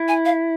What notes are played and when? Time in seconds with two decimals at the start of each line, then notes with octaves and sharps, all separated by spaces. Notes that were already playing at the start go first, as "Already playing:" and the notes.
Already playing: E4
0.08 G#5
0.25 F5